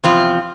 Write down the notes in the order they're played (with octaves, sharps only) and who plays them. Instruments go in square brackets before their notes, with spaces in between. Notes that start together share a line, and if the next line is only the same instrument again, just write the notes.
[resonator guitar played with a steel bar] E2 C3 F3 C4 F4